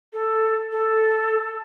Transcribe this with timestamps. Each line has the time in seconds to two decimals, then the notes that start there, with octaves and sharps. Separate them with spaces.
0.13 A4
0.72 A4